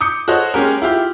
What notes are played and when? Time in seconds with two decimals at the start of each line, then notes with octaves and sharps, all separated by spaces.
0.01 D6 D#6 G6 C#7
0.28 F#4 A4 C5 C#5 D#5 F#5
0.54 G#3 A#3 C#4 G4 A#4
0.82 E4 F4 G4